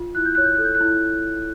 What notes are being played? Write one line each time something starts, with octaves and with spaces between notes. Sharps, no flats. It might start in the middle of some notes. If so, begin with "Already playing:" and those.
Already playing: F4
E4 F#6
G6
C#5 F#6
G6
A4 F#6
G6
F#6
E4